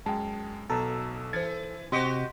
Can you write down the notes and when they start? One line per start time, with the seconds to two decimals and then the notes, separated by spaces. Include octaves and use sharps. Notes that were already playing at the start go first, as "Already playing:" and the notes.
0.06 F#2 G#3 G5 A5
0.70 B1 B2 A4 A#5 E6
1.33 E3 C5 G#6 A6
1.92 C3 C4 F#4 G4 D#5 C6 B6 D7